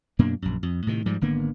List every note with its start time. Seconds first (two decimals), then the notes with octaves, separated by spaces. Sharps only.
0.19 F#2 B2 A#3 D4
0.42 A#1 F#2
0.63 F2
0.87 A2 C3 D#3
1.06 G#2 F3 G3
1.21 G#1 D3 A#3 B3